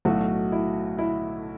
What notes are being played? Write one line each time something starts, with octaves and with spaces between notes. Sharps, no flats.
B1 A2 F#3 A3 F#4
E4
E4